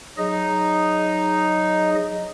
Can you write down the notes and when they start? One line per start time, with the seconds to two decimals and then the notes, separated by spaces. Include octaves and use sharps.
0.18 F#3 D#4 G#4 D#5